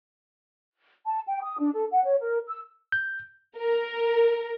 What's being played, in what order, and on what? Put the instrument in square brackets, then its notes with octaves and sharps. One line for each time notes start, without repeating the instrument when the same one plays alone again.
[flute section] A5
G5
D#6
D4
A4
F#5
C#5
A#4
E6
[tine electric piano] G6
[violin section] A#4